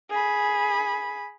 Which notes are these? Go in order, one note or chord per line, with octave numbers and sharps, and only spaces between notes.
G#4 B5